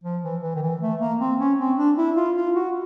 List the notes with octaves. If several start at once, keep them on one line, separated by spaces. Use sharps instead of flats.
F3
E3
E3
D#3
E3
A3
A#3
C4
C#4
C4
D4
E4
F4
F4
F#4